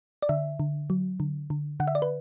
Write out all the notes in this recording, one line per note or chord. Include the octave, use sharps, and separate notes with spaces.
D5
D3 E5
D3
F#3
D3
D3
D3 F#5
E5
D5
B4